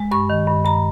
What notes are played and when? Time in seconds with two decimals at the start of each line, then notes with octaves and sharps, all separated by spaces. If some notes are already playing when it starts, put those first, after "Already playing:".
Already playing: G#3
0.11 G2 C#6
0.30 D#3
0.47 G2
0.65 G2 A#5